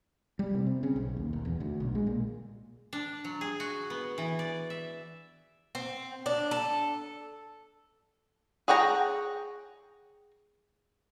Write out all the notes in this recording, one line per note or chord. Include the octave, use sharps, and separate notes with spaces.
G3
C3
C4
C#3
B1
D#2
D#1
E2
D2
B1
G#3
A#2
D4
F#3
G#4
F#4
B3
E3
D5
E5
C4
D4
A4
G#4 C#5 F#5 G5 A#5